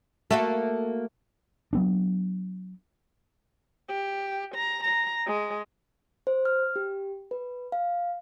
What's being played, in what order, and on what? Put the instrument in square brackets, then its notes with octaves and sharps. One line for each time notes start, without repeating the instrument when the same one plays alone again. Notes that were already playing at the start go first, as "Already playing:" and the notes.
[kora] A3 [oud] A#3 F#4 A4
[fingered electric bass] F#3 B3 D4
[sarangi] G4
A#5
A#5
G#3
[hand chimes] C5
F6
G4
B4
F5